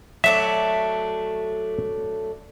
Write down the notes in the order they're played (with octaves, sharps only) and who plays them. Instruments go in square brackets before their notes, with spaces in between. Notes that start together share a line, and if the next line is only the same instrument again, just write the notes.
[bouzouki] F#3 A3 D4 [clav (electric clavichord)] E5